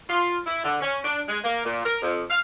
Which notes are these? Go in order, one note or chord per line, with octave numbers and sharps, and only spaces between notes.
F4
E4
D3
C#4
D4
G#3
A#3
A#2
A#4
F2
F5